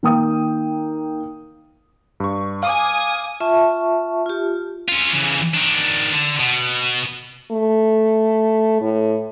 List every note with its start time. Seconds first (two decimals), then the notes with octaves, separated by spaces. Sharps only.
0.03 D#3 A#3 G5 D#6
2.20 G2 C#6
2.63 F5 G#5 D6 D#6
3.40 F4 E5 A5 C#6
4.26 F4 G4
4.89 C#4 F4
5.13 C#3 E3
5.54 D#3 D4
6.13 D3
6.39 B2
7.51 A3
8.81 A2